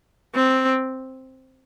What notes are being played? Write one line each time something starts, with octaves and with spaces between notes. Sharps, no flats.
C4